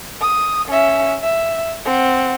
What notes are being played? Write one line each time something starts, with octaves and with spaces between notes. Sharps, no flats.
D#6
C#4 E5
E5
C4 F#5